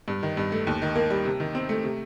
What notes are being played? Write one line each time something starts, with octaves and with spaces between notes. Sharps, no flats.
G2
D#3
G2
A3
D#2
D#3
A#3
G3
C3
D#3
C4
A3
C3